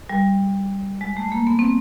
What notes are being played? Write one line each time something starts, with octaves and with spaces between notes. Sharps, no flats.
G3
G#3
A3
A#3
B3
C4